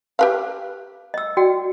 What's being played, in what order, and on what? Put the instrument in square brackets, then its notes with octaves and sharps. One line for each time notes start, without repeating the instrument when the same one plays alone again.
[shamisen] G4 B4 F5
[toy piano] D#5 E6
F#4 D5 G5